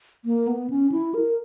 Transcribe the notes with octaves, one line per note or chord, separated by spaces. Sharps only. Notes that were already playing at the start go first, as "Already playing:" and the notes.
A#3
B3
C#4
E4
A#4